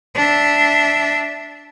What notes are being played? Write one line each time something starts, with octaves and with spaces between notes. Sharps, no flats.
D4 E5